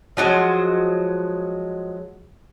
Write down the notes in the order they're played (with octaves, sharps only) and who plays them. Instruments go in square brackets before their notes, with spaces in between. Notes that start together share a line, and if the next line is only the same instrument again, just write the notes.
[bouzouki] F3 F#3 G#3 F#4